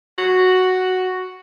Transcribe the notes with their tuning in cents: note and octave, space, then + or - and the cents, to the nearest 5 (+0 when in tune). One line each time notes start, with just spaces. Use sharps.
F#4 +0